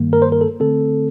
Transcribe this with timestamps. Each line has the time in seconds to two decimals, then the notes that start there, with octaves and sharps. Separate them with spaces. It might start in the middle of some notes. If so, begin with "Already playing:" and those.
Already playing: G2 D#3 G3 A#3
0.13 A#4
0.22 C5
0.32 A#4
0.41 A4
0.60 D3 A3 C4 A4